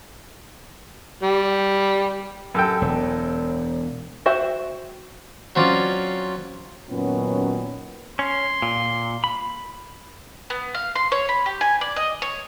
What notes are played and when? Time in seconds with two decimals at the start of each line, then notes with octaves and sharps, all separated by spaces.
1.23 G3
2.54 F#2 A4 G5
2.82 E1
4.26 F#4 C5 E5 G5
5.56 F#3 C4 C#4 F4 D5
6.89 F#2 A#2 D#3 F#3 B3 C#4
8.19 C#4 C6
8.62 A#2
9.24 B5
10.50 B3
10.75 F5
10.96 C6
11.12 C#5
11.29 B5
11.46 G4
11.61 G#5
11.81 D5
11.96 D#5
12.22 C#5